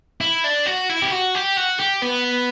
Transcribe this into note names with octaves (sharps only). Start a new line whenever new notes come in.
E4
D4
F#4
E4
G4
F#4
G4
F#4
G4
B3